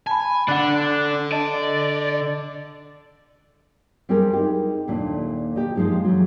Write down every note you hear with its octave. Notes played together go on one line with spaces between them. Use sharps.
G#5 A5 B5
D3 D4 F#5 F#6
D5 D#5 A5
G3 C4 E4 G4 G#4 A#4
D#4 G4
D#2 A#2 A3 D4
G4 D#5
F3 G#3 A#3 D#4 G4
E3 F#3